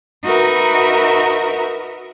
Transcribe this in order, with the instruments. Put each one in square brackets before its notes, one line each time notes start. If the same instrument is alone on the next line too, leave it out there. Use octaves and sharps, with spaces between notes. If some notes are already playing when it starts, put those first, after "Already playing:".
[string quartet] D#4 F#4 A#4 B4 E5